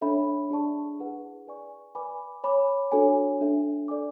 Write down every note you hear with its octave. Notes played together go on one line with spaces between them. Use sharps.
D4 A4 C#5 E5 B5
D4 G#4 D5 A5 C#6
E4 G#4 B4 F#5
B4 D5 G#5 C#6
B4 D5 G#5 B5 D6
C#5 G#5 B5 D6
D4 F#4 A4 C#5 G#5
D4 A4 E5
A4 D5 G#5 D6